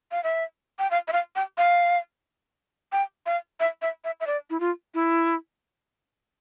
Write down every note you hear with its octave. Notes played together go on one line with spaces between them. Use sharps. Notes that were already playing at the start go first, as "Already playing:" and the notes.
F5
E5
G5
F5
E5
F5
G5
F5
G5
F5
E5
E5
E5
E5
D5
E4
F4
E4